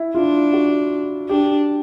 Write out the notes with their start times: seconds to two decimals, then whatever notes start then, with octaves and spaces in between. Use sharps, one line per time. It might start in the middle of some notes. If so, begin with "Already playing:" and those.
Already playing: E4
0.15 D4 F4
0.53 F#4
1.29 D4 G4